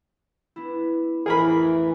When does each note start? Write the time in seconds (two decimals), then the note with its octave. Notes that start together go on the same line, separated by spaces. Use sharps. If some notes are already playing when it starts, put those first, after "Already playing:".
0.56 B3 D4 E4
1.26 A1 F2 E3 D#4 G#4 A#4 B5